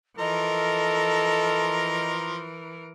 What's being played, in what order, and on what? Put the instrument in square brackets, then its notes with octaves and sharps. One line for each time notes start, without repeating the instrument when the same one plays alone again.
[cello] E3 A#4 [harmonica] F3 A#5 [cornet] A4 [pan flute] D#5